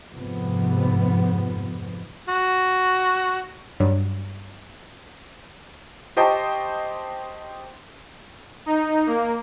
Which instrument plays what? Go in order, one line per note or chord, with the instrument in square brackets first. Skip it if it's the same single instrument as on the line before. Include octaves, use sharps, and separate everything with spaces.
[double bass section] F2 G#2 C3 F3 B3
[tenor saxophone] F#4
[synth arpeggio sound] G2 F#3 G3
[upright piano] G4 C5 D#5 G5 A5 C#6
[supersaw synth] D#4
A#3